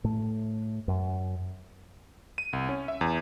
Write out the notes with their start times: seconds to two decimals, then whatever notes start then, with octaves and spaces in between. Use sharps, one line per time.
0.04 A2 A3
0.88 F#2
2.38 D#7
2.53 C2
2.69 C#4
2.88 E5
3.01 E2